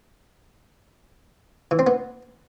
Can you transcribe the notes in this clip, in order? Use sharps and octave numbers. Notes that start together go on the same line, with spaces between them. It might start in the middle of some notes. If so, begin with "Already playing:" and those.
E3
C4
B3